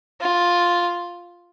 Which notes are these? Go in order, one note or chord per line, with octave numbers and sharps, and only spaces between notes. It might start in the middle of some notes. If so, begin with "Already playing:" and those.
F4